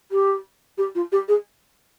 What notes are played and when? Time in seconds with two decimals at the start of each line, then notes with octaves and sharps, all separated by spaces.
0.12 G4
0.78 G4
0.95 F4
1.12 G4
1.28 G#4